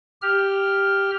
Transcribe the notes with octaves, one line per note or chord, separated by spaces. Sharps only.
G4 F6